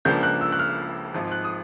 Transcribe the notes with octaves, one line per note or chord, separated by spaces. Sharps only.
C#2 C#3 F3 A#3 D4 G6
F#6
E6
F#6
F6
G#1 G#2 F3
F#6
D#6